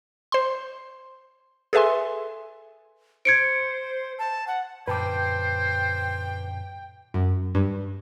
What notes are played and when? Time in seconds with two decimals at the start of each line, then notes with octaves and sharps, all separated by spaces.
0.32 C5 C6
1.73 G#4 A4 B4 E5 G#5 C6
3.25 C5 G#6 C#7 D7
4.19 A5
4.47 F#5
4.87 F#2 A#2 D3 B4 C5 G5 A5 D6
7.14 F#2
7.55 G2